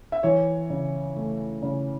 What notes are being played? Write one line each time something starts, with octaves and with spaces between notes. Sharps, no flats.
E5
E3 C#5
C#3
A3
C#3